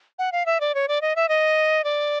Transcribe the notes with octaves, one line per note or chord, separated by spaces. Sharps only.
F#5
F5
E5
D5
C#5
D5
D#5
E5
D#5
D5